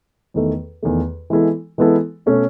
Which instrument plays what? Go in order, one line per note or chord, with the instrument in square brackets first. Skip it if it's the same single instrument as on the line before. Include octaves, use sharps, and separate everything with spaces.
[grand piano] E2 D#3 A3
E2 D#3 A3
E3 G#3 B3 E4 A4
E3 G#3 B3 E4 A4
B2 A3 C#4